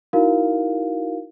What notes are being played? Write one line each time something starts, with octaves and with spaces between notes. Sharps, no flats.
D#4 E4 F#4 A#4 F5